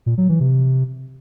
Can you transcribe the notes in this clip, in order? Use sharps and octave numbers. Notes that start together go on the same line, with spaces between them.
A#2
F#3
E3
C3